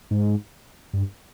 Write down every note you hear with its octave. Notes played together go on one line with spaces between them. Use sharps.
G#2
G2